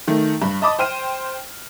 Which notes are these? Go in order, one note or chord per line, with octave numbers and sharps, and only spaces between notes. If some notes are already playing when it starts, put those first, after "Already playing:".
D#3 A3
G2 B5
D#5 A5 B5 D6 D#6
C5 G5 F6 D#7